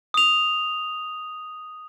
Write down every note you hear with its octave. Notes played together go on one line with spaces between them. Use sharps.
D#6 F7